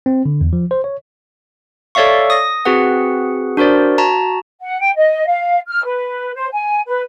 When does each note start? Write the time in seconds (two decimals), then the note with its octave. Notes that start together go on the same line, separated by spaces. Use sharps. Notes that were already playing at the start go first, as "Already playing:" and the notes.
0.06 C4
0.25 D3
0.41 E2
0.53 F3
0.71 C5
0.84 C#5
1.95 A4 C#5 D5 E5 F5 C#6
2.30 D#6 A#6
2.65 C4 F#4 G#4 B4 F#5
3.57 D4 F#4 A#4 C5 D5
3.98 F#4 A5 A#5
4.60 F#5
4.80 G5
4.95 D#5
5.27 F5
5.68 F6
5.84 B4
6.35 C5
6.51 G#5
6.86 B4